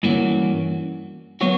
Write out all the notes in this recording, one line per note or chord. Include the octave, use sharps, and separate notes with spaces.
G2 E3 A#3 C#4 F#4
F#3 B3 F#4 C#5